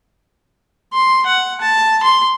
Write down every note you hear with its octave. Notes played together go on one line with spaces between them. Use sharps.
C6
F#5
A5
C6